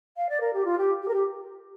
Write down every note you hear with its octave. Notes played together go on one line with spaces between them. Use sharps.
F5
D5
A#4
G4
F4
G4
G4
A#4
G4